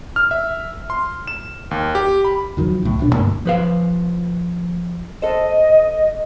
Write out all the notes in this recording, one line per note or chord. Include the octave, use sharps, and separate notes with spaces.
F6
E5
C6
E7
D#2
G4
B5
E2 D#3 F3 F#3
C#2 A2
D#1 B2 C#4 D4
D2 G2 G3 A#3
F3 B4 F5
A4 C5 D#5